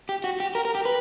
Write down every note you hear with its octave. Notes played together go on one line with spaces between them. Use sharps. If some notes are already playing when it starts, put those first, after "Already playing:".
G4
F#4
G4
A#4
A#4
G4
B4